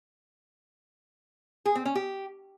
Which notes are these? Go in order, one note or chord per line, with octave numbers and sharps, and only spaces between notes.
G#4
C4
C#4
G4